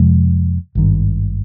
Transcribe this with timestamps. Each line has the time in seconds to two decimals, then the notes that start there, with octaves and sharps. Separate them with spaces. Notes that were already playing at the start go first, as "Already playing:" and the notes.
Already playing: F2 C3 F3 G#3
0.75 G#1 G2 D#3